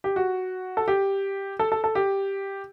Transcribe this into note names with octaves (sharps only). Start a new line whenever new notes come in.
G4
F#4
A4
G4
A4
A4
A4
G4